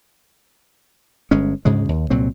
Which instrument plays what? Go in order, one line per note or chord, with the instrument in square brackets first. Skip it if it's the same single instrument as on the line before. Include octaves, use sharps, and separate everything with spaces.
[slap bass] G1 G#3 C#4
D2 G#2 C#3 G#3
D#2
C2 A#2 F#3 C4